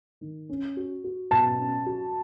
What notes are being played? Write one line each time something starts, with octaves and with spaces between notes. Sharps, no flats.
D#3
C#4
F#4
F#4
B2 A5
C#4
F#4